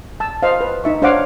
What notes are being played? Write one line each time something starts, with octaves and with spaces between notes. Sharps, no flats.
A5 E6
C5 D#5 F5
B4
D#4 E5 C#6
D4 C5 C#5 F5 F#5 D6